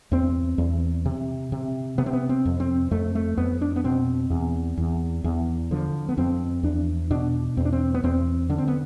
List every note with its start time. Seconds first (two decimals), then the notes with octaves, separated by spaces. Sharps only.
0.12 E2 C4
0.58 E2
1.06 C3
1.52 C3
1.98 C3 B3
2.06 C4
2.13 B3
2.29 C4
2.45 F2
2.60 C4
2.91 F2 A3
3.15 A3
3.37 F2 B3
3.61 D4
3.76 B3
3.84 B2 C4
4.30 E2
4.77 E2
5.24 E2
5.71 D3 F3
6.09 B3
6.17 F2 C4
6.63 E2 D4
7.11 B2 D4
7.57 E2 C4
7.65 D4
7.73 C4
7.94 B3
8.04 E2 C4
8.50 D3 D4
8.58 C4
8.68 B3